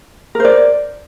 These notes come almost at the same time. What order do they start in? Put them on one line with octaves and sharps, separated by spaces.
A#4 C5 D5